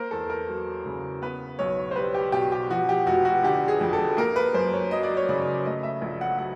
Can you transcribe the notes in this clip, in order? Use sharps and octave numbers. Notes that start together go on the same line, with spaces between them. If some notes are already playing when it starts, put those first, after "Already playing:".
Already playing: A#3 A#4 C5
E2 A4
A#4
F#3
C#3
B3 B4
B1 C#5
C5
G3 B4
G4
B2 G4
G4
F3 F#4
G4
F1 F#4
F#4
D3 G4
G#4
F2
A4
A#3 A#4
B4
F#2 C5
C#5
F#3 D#5
D5
C#5
C#3 D5
A3 D#5
E5
A#1
F#5
F#3 F#5